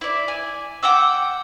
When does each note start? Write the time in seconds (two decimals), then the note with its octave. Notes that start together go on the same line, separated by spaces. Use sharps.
0.01 E4 D5
0.28 G#5
0.83 F#5 G5 D6 E6